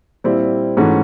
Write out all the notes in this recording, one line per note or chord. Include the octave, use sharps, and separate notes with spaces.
A#2 G3 C4 E4
G#2 E3 A3 C#4 F#4